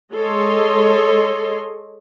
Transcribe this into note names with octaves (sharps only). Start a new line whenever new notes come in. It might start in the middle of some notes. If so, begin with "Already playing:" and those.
G#3 A4 C#5 D#5 C6